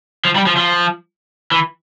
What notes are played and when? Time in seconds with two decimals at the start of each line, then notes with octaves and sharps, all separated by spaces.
0.25 F3
0.36 G3
0.46 F3
0.57 F3
1.52 E3